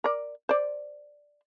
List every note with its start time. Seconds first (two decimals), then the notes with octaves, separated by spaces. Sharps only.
0.04 A#4 D5
0.49 C5 D5